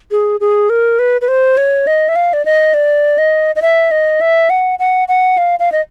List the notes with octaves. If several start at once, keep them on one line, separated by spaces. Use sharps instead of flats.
G#4
G#4
A#4
B4
B4
C5
C#5
D#5
E5
F5
D5
D#5
D5
D#5
D#5
E5
D#5
E5
F#5
F#5
F#5
F5
F5
D#5